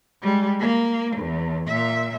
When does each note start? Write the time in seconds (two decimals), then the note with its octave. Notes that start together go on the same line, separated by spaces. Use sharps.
0.22 G3 G#3
0.60 A#3
1.17 E2
1.67 A#2 E5